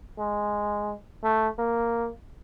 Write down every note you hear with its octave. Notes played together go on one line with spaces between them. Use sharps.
G#3
A3
A#3